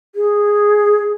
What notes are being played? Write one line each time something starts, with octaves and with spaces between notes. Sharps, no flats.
G#4